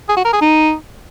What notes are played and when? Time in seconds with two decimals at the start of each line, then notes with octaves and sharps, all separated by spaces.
0.08 G#4
0.17 F#4
0.25 A#4
0.33 G#4
0.41 D#4